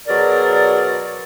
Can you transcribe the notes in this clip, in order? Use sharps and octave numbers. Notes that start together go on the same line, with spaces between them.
B2 F#3 G#4 A#4 D5